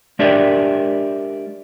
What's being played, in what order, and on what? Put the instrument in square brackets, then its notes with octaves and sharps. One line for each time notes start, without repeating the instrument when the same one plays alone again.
[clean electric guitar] G#3 D4 G4 A#4 D5 E5